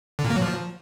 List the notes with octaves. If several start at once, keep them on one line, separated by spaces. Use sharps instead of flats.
D3
A#2
A#3
F#3
F3